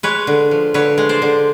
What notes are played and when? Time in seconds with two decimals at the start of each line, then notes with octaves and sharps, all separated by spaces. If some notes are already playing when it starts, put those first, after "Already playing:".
0.03 G#3 B4 C#5
0.27 D3
0.51 F3
0.74 D3 B4 C#5
0.98 G#3
1.09 C5 D5
1.22 D3